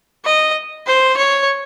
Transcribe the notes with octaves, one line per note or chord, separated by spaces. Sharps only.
D#5
C5
C#5